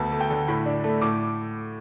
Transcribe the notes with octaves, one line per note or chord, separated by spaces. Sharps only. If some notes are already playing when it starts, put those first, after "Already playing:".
Already playing: D2 B3 A5
A3
G5
D3
A2 B5
D4
A3
A2 D6